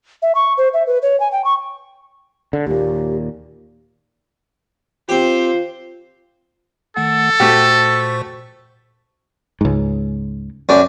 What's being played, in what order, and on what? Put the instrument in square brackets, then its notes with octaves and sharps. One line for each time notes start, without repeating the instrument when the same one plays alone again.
[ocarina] E5
C#6
C5
E5
B4
C#5
G#5
G5
C#6
[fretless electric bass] D3
[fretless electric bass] D#2 A#2 [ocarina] G4
[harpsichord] C4 G4 [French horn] F4 [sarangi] C5
[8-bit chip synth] D#3 A3 F#5 [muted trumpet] A4
[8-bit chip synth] A#2 C5 C#6 [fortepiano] A3 F#4 G4
[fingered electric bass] C#2 G#2
[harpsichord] F#2 D4